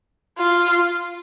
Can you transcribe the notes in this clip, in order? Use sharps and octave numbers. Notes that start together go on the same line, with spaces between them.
F4